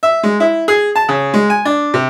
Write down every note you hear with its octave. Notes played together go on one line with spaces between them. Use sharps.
E5
G#3
E4
G#4
A5
C#3
G#3
G#5
D4
C3